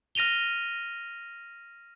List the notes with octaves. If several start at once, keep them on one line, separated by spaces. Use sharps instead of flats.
F6 A#6 D#7 F7 G7